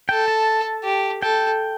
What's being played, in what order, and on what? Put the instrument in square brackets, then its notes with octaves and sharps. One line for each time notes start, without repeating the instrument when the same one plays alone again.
[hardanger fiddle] A4 [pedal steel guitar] G5
[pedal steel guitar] A5
[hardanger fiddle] G4
[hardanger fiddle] A4 [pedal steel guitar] G5